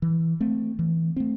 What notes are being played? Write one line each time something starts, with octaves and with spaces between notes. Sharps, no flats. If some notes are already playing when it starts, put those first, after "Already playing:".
E3
A3 C4
E3
A3 C4